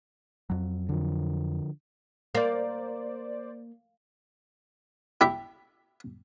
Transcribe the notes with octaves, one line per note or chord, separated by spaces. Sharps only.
F2 F#3
D3 F3
A#3 C5 D5
E4 G4 E5